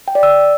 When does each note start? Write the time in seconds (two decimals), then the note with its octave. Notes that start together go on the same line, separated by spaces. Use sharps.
0.08 G5
0.15 D5
0.23 E6